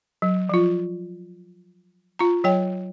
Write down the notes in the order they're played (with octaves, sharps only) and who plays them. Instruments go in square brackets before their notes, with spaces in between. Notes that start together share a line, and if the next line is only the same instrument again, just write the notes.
[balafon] F#3
F3 F4
F4 A#5
F#3 C#5 G5